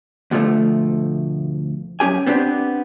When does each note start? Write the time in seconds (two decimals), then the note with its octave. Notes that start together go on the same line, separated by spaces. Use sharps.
0.31 D2 B2 F3 G3 A3
2.00 F#2 C#4 G4 G#5
2.27 B3 C4 D4 F#4 G4